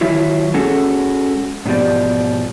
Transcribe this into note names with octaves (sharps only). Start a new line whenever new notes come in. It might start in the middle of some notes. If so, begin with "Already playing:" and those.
D#3 F#3 E4 F4
G#3 C#4 F#4 G#4 A4
G#2 B2 F3 G4 D5